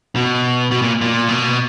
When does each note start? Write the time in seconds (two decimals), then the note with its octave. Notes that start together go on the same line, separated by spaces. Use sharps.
0.16 B2
0.72 B2
0.82 A#2
1.01 A#2
1.28 B2